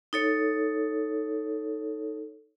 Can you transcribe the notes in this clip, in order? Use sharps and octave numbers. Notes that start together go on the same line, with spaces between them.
D#4 A4 C#5